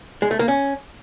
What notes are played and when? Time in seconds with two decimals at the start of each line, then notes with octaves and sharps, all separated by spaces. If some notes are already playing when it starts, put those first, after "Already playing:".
0.22 G#3
0.31 A3
0.39 A#3
0.48 C#4